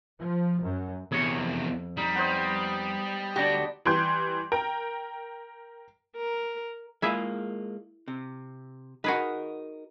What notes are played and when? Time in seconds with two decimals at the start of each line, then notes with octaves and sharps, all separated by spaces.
0.20 F3
0.62 F#2
1.12 E2 C3 G#4 C#5
1.38 F2
1.97 G3 D#4
2.15 B3 C5 D#5
3.36 D2 D4 F#4 G4
3.85 E3 G3 G5 C6 G6
4.52 A#4 G5
6.16 A#4
7.02 G#3 A#3 E4 F4 G#4 E5
8.08 C3
9.04 D#4 F#4 G#4 A#4 B4